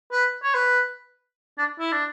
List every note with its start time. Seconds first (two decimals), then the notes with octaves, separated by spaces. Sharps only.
0.12 B4
0.43 C#5
0.54 B4
1.58 D4
1.79 E4
1.92 D4